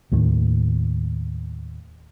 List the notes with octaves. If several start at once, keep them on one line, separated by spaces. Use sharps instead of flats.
D#2 A2 D#3